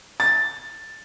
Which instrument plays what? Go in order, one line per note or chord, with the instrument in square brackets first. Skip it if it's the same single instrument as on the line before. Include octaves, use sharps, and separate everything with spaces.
[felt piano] A6